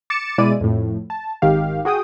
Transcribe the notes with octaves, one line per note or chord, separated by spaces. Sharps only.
D6 A6 C#7 E7
B2 G#3 E4 D5 D#7
F2 A2
A5
G#1 D#3 G4 F5
F#4 G#4 G5 D#6